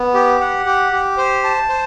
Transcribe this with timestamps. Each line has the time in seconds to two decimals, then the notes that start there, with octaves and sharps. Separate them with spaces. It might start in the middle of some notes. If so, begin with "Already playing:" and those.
Already playing: B3
0.14 G4
0.41 F#5
0.66 G4
0.92 G4
1.17 C5
1.44 A5
1.69 C5